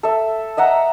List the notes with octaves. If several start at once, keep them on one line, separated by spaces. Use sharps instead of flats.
A4 E5
D#5 E5 F#5 A#5